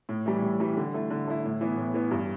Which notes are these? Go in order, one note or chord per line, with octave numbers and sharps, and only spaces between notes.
A2
E3 G3
A2
E3 G3
D3
A3 E4
D3
A3 E4
A2
E3 B3
A2
E3 B3
G2